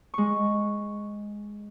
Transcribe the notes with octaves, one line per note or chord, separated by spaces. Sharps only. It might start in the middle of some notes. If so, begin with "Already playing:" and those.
G#3 C#6